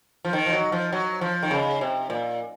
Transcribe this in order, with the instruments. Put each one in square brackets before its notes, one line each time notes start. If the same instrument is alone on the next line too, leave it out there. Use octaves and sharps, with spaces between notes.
[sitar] F3
D#3
F3
F#3
F3
F#3
F3
D#3
C#3
C3
A#2